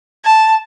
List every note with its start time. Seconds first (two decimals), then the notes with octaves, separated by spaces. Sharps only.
0.24 A5